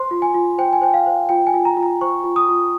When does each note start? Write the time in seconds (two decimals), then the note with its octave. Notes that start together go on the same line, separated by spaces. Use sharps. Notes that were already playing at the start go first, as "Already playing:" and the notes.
Already playing: C5 C6
0.11 F4
0.22 G#5
0.34 F4
0.58 C5 G5
0.73 G#5
0.81 C5 G5
0.94 F5
1.06 C5
1.29 F4 G5
1.47 G#5
1.54 F4
1.65 A#5
1.77 F4
1.83 A#5
2.01 C5 C#6
2.24 F4
2.36 D#6
2.49 F4